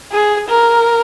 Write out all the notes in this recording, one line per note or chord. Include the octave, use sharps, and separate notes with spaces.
G#4
A#4